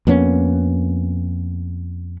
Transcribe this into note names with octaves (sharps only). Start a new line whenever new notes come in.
F2 A#3 B3 C#4